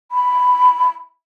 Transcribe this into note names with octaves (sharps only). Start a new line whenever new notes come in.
B5